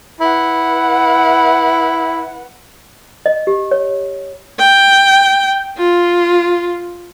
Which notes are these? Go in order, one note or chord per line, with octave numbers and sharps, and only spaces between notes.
E4 B4 F#5
D#5
G4
C#5
G5
F4